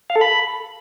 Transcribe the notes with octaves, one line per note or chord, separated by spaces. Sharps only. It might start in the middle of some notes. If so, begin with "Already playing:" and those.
F5
A4
B5